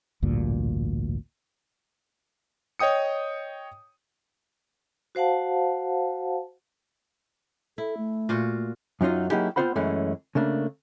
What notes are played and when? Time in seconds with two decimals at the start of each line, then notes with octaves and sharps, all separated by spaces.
0.22 A1 D2 G2 A#2
2.79 C#5 D#5 G5 D#6 C#7
5.15 F#4 C5 F5 F#5 A5
7.78 E4 A4
7.97 A3
8.29 A#2 F4 F#4
9.01 F#2 F#3 D#4 F4 D#5
9.30 F#3 A#3 D#4 E4 G4 G#4
9.56 B3 C4 F4 C5 F#5 B5
9.76 F#2 E3 G#3 A3 C#4
10.35 C#3 A3 A#3 D4